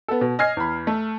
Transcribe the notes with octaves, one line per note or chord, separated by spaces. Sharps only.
B3 A4
B2
D#5 G#5 F6 G#6 C7
E2 B5
A3